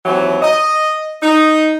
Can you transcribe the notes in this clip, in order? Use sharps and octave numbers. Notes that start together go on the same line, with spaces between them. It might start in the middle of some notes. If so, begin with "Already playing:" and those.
D#2 E3 F#3 C4
D#5
D#4